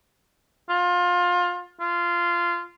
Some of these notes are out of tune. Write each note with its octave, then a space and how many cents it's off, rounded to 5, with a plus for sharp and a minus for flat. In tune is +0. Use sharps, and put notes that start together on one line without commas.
F4 +25
F4 -15